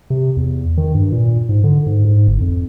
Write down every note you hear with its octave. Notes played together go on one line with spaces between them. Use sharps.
C3
E2
D#3
G2
A#2
G#2
D3
G#2
G#2
G1
F2